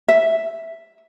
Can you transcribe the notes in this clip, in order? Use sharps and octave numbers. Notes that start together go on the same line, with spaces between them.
E5